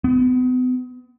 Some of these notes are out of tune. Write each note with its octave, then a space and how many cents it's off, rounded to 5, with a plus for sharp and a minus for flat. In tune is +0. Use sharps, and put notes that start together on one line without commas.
B3 +40